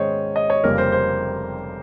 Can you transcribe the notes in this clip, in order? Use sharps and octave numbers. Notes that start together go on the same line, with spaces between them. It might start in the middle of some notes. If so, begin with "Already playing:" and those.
Already playing: G#2 D#3 G#3 C#4 C5 C#5 D#5
D#5
C#5
F1 F2 C#3 G3 A#3 A#4
C5
C5